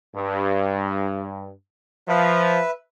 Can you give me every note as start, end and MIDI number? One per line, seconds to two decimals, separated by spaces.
0.15 1.52 43
2.09 2.60 53
2.09 2.71 71
2.09 2.71 76